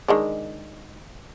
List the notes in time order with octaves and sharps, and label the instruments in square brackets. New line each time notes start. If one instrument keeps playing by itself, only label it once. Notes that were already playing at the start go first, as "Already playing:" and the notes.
[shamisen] D#3 G#3 D4